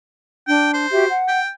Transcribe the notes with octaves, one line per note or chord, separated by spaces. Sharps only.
D4 G5
C5
F#4 G4 E5
F#5
G5